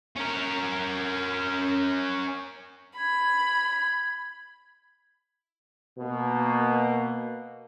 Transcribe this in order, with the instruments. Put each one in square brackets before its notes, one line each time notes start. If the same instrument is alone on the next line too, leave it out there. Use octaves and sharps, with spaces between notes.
[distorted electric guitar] C#4 A#4
[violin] B5 [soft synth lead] G#6
[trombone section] B2 A#3